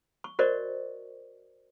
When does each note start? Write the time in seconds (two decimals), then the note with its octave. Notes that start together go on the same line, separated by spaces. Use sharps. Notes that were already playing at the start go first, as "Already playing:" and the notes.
0.24 C#6
0.39 F#4 A#4 C5 D5 D#5 C#6